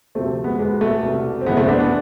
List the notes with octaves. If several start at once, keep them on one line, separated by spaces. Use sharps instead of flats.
D2 C3 F3 A3 C4
G#3 B3
E2 B2 G#3
A3
C2 B2
C4
C2 C3 E3 G#3 B3
A3 C4
B3 D4
B3 D4